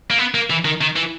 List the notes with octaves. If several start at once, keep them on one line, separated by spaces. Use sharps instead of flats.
A#3
B3
A#3
E3
D#3
D#3
E3